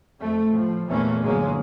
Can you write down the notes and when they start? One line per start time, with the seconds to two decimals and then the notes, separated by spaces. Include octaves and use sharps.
0.19 F2 A3
0.49 A2 F3
0.88 E2 A#2 E3 A3 A#3 C#4
1.22 G1 G#2 F#3 G#3 A#3 C#4